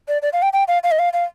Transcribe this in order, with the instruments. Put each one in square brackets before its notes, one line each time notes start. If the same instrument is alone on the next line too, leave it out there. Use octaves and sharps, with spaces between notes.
[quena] D5
D5
F5
G5
G5
F5
F5
D#5
F5
F5